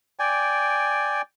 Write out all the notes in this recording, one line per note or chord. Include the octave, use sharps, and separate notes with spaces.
D5 G5 G#5